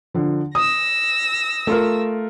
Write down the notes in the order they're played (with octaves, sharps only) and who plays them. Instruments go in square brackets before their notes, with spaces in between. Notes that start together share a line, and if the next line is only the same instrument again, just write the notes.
[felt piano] D3 F3
[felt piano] D#6 [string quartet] E6 A#6
[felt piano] A3 F4 A#4